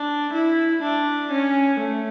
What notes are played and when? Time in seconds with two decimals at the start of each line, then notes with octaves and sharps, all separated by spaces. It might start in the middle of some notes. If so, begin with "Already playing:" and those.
Already playing: D4
0.33 E4
0.82 D4
1.31 C#4
1.80 A3